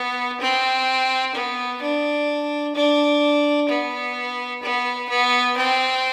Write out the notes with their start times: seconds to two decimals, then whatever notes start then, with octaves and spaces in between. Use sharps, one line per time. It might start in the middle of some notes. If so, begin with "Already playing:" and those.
Already playing: B3
0.40 C4
1.35 B3
1.82 D4
2.75 D4
3.69 B3
4.62 B3
5.09 B3
5.57 C4